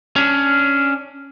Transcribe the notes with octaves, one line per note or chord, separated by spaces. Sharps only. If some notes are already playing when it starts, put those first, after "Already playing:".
C#4 D4